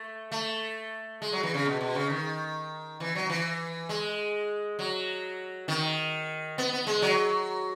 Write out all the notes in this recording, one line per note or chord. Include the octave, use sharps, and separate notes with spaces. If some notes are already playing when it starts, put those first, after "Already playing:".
Already playing: A3
A3
G#3
F#3
E3
C#3
B2
B2
C#3
D#3
E3
F#3
E3
G#3
F#3
D#3
B3
B3
G#3
F#3